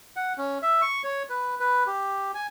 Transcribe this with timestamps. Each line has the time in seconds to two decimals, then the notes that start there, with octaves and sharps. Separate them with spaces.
0.16 F#5
0.38 C#4
0.62 E5
0.82 C#6
1.04 C#5
1.30 B4
1.60 B4
1.87 G4
2.35 G#5